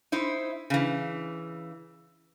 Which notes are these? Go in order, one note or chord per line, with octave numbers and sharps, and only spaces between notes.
D#4 E4 C5
C#3 E3